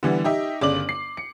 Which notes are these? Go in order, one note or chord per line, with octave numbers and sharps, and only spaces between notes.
D3 E3 G3 B3
D#4 G4 D#5 E5
G1 C#3 D5 D6 F#7
C7
C#7